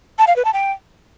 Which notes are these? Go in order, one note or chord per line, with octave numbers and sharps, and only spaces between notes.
A5
F5
B4
A5
G5